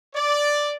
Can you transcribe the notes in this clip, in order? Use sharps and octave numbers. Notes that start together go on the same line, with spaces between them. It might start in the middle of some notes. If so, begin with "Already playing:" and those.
D5